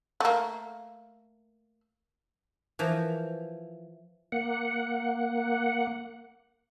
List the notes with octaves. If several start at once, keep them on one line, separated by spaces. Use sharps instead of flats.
A3 A#3
E3 F3 A#4
A#3 F#5